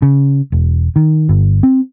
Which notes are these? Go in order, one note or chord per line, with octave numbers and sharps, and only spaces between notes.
C#3
E1
D#3
G1
C4